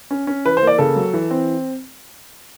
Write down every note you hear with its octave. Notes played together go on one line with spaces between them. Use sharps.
C#4
C#4
E3 B4
C5
A#3 D5
C#3 A4
F#3
E3
C4